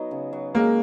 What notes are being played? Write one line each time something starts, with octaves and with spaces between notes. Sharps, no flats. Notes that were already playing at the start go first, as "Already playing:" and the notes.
Already playing: F#3 B3 D#4
C#3
F#3
G#3 A#3 A#4